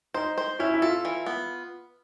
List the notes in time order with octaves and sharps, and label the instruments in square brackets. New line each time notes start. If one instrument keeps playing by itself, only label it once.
[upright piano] D#4 [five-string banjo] C5
[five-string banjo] C5
[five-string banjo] C#4 [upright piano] E4
[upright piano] E4
[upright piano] F4 [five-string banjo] A4
[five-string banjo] E3
B3